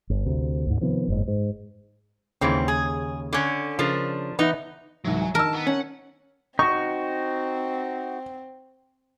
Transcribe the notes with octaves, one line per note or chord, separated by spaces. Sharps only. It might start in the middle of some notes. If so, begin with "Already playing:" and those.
G1
D2 C3
D2 G#2
C3 D#3 F3 B3
F#1 G#2
G#2
D#2 G#2 C#3 E3 C4
G#4
D3 C#4
C#3 F3 D4 A#4
E3 B3 D#4 E4
C2 G#2 E3 F#3
G#5
D#3 D#4 A#4 A5 E6
B3
C#4 F#5
C4 D#4 F#4 C#6